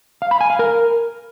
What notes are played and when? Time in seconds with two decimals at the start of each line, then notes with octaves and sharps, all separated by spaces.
0.22 F5
0.31 B5
0.41 G#5
0.50 F5
0.59 A#4